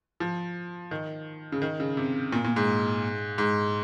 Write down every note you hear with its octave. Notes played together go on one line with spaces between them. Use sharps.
F3
D#3
C#3
D#3
C#3
C3
A#2
A#2
G#2
G#2